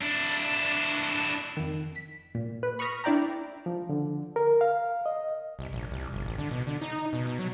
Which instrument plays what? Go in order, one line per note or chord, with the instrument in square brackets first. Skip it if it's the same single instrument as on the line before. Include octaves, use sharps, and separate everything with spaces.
[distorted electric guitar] D4 E4
[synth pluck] F2 D#3
B6
A#2
B4
B5 C#6 D#6 F6 A#6 B6
D4 E4 D5 G5 A#5
[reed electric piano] F3
D3
A#4
F5
D#5
[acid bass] C2
A#1
C2
G1
A1
D3
B2
D3
D#4
B2
B2
F#3